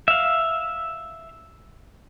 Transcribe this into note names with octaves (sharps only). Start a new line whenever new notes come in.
E5 F5